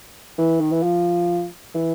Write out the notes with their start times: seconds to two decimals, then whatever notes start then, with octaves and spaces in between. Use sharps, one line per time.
0.38 E3
0.60 D#3
0.72 E3
0.83 F3
1.74 E3